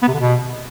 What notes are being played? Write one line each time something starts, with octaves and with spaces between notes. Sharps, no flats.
B3
C3
D3
B2